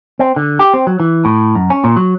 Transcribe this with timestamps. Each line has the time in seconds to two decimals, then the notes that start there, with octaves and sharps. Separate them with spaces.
0.19 C4
0.36 D3
0.59 G4
0.74 C4
0.87 F#3
1.00 E3
1.25 A2
1.55 F#2
1.70 C#4
1.84 A#2
1.96 F#3